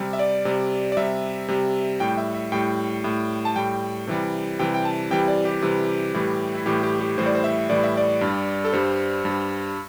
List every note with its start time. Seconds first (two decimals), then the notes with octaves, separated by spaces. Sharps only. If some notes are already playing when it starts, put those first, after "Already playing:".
Already playing: C3 G3
0.13 E5
0.19 D5
0.45 C3 G3
0.92 D5
0.97 C3 G3 E5
1.48 C3 G3
2.00 A2 G3 G5
2.18 E5
2.35 E5
2.52 A2 G3 G5
3.04 A2 G3
3.45 A5
3.56 A2 G3 G5
4.07 C3 E3 G3
4.59 C3 E3 G3 G5
4.74 G5
4.85 A5
5.10 C3 E3 G3 G5
5.28 D5
5.45 G4
5.62 C3 E3 G3
6.14 A2 E3 G3
6.55 E4
6.66 A2 E3 G3 G4
6.83 G4
7.01 G4
7.18 A2 E3 G3 C5
7.26 D5
7.35 C5
7.44 E5
7.69 A2 E3 G3 D5
7.83 E5
7.97 D5
8.21 G2 G3
8.65 A4
8.73 G2 G3 C5
9.25 G2 G3